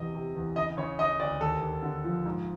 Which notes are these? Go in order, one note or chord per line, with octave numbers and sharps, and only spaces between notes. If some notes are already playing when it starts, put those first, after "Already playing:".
Already playing: E2 C3 D#5
C3
E2
C#3 D#5
C#3 C#5
C#3 D#5
D2 D5
D#2 A4
D#2
D3
F3
G#2